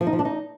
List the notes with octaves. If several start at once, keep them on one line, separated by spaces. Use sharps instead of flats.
F3
D#4
F3
D4
D#4